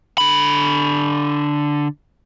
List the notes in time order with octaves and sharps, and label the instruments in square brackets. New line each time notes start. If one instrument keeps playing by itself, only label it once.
[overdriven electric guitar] D3 B5